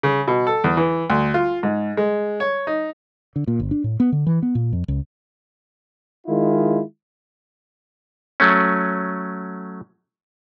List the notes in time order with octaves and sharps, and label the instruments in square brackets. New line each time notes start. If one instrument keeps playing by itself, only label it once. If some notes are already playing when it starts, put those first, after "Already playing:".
[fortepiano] C#3
B2
A4
E2
E3
D2
F4
G#2
G#3
C#5
D#4
[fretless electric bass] D3
A#2
G1
D4
A2
B3
D3
E3
B3
A#2
F2
C#2
[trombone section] D#3 G#3 E4 F4
[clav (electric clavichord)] F#3 A3 C#4